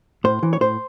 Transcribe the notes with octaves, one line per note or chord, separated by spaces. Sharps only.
A2 C5
E3
C#5
A2 C5